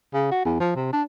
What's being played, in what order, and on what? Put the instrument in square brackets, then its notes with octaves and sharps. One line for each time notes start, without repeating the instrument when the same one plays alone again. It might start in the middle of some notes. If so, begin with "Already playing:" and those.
[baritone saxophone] C#3
F#4
E2
F3
C3
D4